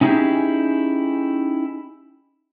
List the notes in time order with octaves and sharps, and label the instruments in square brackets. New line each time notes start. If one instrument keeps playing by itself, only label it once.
[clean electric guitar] C#4 D#4 E4 G4 G#4